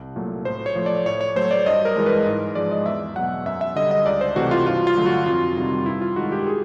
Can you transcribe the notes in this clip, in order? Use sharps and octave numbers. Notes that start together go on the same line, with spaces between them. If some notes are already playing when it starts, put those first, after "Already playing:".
Already playing: C2
A#2 F#3 A3
A2 C5
C#5
F3 A3
D5
A2 C#5
C#5
F#3 A3 C5
D5
G2 D#5
A#4
E3 G#3
B4
G#2
F3 G#3 D5
D#5
E2 E5
B2 F#3 F#5
F#2 E5
E5
D3 G3 D#5
D#5
C#2 D5
C5
C3 E3 A3 F#4
F4
G2 F4
F4
D3 F#3 A3
F#4
F2 F4
C3 D#3 G3
G2 E4
F4
D#3 G#3 F#4
G4
G#4